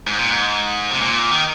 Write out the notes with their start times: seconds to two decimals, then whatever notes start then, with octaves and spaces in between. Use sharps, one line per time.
0.07 G#2
0.18 A#2
0.30 G#2
0.91 C3
1.01 A#2
1.32 D#3